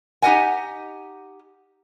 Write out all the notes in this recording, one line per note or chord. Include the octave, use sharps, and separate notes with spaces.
D#4 G4 B4 D#5 F#5 G#5